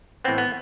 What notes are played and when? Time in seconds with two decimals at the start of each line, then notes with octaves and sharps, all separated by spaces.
0.24 A2 E3 B3 C4
0.38 B3